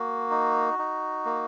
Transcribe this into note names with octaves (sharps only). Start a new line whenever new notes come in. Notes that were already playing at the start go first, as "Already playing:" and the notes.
Already playing: A#3 F#4
D#4
D#4
A#3